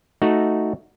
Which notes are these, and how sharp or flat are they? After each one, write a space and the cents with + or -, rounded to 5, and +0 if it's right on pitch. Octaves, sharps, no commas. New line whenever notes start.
A3 +0 D#4 +0 F#4 +0